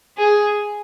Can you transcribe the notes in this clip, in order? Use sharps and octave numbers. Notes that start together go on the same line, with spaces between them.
G#4